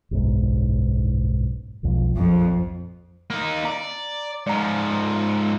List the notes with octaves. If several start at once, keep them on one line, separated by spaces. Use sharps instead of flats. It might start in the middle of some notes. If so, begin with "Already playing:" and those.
F#1 B1 G#2
E1 B1 F2
A#1 F2
A#3 D#4
D5 A#5
G#2 F3 D5 A#5